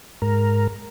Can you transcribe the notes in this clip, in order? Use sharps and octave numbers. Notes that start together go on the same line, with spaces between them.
G#2 A#4